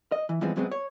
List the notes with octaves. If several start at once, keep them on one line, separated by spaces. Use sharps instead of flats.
D#5
E3
G2 E3 F3 G#3 B3 C4
F#2 C3 F#3 G#3 B3 C4
C#5